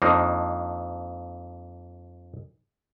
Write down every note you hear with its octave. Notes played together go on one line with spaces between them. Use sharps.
F2 A#3 D4 D#4